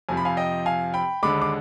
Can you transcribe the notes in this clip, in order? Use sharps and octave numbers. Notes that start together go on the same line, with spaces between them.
F2 C3 F3 G#5
B5
F5 G#5
D#5 G5
F5 G#5
G5 B5
D#2 D3 G#3 B5 D6
D6